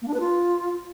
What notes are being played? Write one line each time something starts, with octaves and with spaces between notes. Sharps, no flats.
A#3
D4
B4
F4